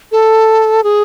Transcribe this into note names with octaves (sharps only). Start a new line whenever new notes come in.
A4
G#4